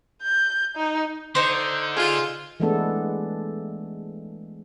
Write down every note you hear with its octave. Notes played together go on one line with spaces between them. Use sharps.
G6
D#4
D3 D#4 C5 C6
F4 G#4
E3 G#3 A3 B3 D4 A4